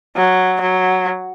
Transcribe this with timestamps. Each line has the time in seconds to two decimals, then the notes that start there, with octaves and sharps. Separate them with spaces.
0.16 F#3
0.61 F#3